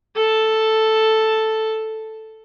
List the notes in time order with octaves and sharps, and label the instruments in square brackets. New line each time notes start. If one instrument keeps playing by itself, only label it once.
[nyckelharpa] A4 A5